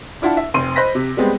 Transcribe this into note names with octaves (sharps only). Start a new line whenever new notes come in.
D4 E4 F4 F#5 A5
E5
F1 C4 C6 D#7
C5 D#5 B5 F#6 A#6 B6
C3
G3 G#3 B3 C4